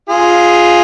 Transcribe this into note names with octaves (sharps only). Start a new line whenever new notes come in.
F4 G#4